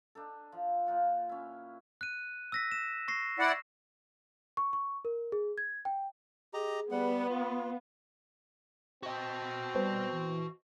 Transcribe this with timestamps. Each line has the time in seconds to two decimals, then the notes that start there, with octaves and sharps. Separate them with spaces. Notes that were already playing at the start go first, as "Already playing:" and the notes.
0.15 D4 D#4 A4
0.52 F3
0.86 A#2 D#4 F4 F#5
1.29 C#4 E4
2.01 F#6 D#7
2.52 E6 A#6 B6
2.72 E7
3.08 C#6 A#6 C7
3.39 E4 D5 F#5
4.57 C#6
4.73 C#6
5.05 A#4
5.32 G#4
5.58 G#6
5.85 G5
6.54 G4 G#4 D#5 A#5
6.91 G3 B3 F#5
7.30 F4 F5
9.03 C4 F#4 D#5
9.75 G3 B3 B4 C5
10.12 E3